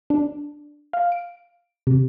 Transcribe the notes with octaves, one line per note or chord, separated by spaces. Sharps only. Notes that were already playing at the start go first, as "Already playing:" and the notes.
D4
F5
D7
C3